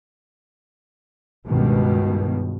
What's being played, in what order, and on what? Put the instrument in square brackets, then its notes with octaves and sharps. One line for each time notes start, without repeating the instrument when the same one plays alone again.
[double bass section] C#2 G2 B2 D#3